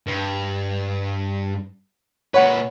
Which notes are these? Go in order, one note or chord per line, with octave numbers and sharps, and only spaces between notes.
G2
A#2 B4 C#5 F#5